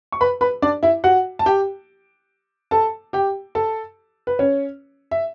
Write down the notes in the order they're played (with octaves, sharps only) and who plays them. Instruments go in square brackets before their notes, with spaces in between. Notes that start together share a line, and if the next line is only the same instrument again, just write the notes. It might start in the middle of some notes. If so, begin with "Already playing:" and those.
[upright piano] C#6
B4 B5
B4 B5
D4 D5
E4 E5
F#4 F#5
A5
G4 G5
A4 A5
G4 G5
A4 A5
B4
C#4 C#5
E5